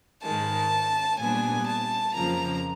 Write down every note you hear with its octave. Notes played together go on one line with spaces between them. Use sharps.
G#2 D#3 G#3 A5
A#2 G3 B3 D4 G#5
A5
F2 C#3 F3 A#3 A#5